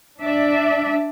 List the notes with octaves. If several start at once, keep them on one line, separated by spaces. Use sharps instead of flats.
D4 D5 E5